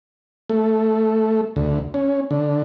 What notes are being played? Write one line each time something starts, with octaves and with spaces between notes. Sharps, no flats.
A3
D2
C#4
D3